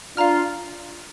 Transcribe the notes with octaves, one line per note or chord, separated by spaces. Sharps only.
D4 F4 F5 A#5 F6